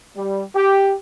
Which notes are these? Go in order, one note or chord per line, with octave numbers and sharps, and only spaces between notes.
G3
G4